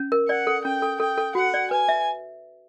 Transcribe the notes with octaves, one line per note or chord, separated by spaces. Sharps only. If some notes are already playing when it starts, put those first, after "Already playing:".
Already playing: C#4
A#4
D5 F#5
A4
C#4 G5
A4
A4 G5
A4
F#4 F#5
D5
B4 G#5
E5